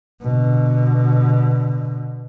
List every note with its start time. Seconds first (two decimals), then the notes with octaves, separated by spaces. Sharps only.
0.22 B2 D3